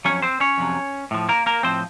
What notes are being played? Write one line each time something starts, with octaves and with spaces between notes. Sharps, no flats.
F2 C3 F#3 C#4 C#5
C4 C5
C#4 C#5
F2 C3 F#3
A2 F3
A#3 A#4
A#3 A#4
A2 F3 C4 C5